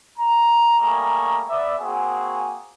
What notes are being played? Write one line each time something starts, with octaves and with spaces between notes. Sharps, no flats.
A#5
G3 A3 A#3 G#4 A#5 C#6
B3 D5 E5
A#3 C4 F#4 G#4